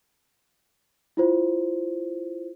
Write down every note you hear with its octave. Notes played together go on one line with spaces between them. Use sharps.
E4 F4 C5